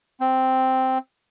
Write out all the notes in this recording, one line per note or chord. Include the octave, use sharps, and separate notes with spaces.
C4